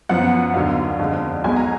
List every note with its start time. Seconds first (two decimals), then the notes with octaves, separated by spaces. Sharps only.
0.09 F#2 F3 B3 F#5
0.54 D#2 D3 F#3 B3 F5
0.99 F2 D3 G#3
1.44 B1 B2 G#3 G#5
1.56 A#5